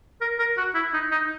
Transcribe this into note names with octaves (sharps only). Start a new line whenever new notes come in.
A#4
A#4
F#4
E4
D#4
D#4